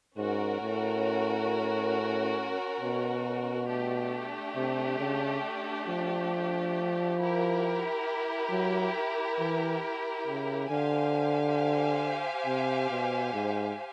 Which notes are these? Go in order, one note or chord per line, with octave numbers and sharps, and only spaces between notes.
G#2 C#4 F#4 A#4 C#5
A2
B2
A3 D4 G4
C3
C#3
F3
E4 G4 A#4
F#3
E3
C#3
D3 G4 C5 F5 G#5
C3
B2
G#2